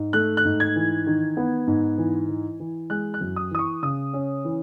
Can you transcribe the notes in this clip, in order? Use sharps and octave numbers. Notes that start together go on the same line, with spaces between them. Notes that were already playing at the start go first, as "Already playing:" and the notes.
Already playing: G#2
A3 F#6
F#6
G#2
G#6
E3
D#3
B3
G#2
E3
E3
E3
G#3 F#6
F#6
F#2
D#6
E3 D#6
C#6
C#3 D#6
C#4
E3